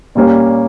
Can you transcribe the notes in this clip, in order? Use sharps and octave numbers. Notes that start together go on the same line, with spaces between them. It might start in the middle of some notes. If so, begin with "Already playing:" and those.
A#2 G3 A#3 C#4